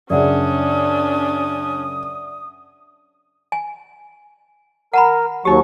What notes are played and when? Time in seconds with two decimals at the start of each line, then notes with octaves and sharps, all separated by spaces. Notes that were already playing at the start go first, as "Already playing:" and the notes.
0.10 F#2 C#3 C#4 D4 D5 E5 F#5 D#6
3.52 G#5
4.94 A#4 F#5 A#5 B5
5.45 D#2 F#3 D#4 G4 C#6